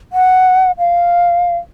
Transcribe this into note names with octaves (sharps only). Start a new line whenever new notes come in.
F#5
F5